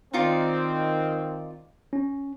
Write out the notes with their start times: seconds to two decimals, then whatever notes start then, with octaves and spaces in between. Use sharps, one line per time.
0.14 D#3 C4 D#4 F4 D5
1.93 C#4